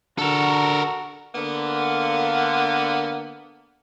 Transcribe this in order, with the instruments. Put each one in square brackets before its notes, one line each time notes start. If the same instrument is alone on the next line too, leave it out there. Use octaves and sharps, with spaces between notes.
[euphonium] D3 [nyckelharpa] F#4 [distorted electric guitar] A4 A#4
[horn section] D3 A#3 B3